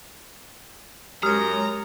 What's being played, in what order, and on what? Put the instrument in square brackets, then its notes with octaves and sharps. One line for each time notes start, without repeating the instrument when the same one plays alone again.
[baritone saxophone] F#2 [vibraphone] G#3 C#5 [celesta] G4 D#6 F6 [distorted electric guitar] A#5